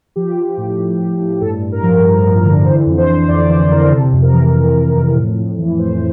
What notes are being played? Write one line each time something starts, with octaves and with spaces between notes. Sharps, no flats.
F3 G4
F3
A2
A2
A2
A2
G2 A4
G2
A#4
F3
G2
F3
D3
E3 C5
F2
C5
F2
F2 D5
E3 C5
F2 A#4
C3 A4
F2
A#4
E3
F2
F2
F2
A2
A2
E3
A2 C5